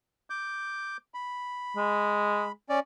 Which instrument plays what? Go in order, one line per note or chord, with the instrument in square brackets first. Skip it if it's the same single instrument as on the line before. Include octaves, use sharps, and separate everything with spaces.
[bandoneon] D6 G6
B5
[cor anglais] G#3
[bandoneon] C#4 D5